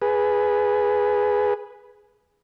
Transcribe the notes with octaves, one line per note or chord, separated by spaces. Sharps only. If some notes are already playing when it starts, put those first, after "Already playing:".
G#4 B4